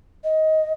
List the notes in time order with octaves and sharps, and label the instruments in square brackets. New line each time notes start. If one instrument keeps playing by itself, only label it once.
[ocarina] D#5